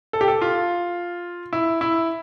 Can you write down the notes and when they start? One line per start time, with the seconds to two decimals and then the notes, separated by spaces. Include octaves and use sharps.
0.13 A4
0.21 G4
0.28 A4
0.42 F4
1.53 E4
1.81 E4